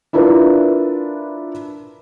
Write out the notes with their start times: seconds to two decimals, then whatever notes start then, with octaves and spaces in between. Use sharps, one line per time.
0.13 D4 E4 F4 A#4 B4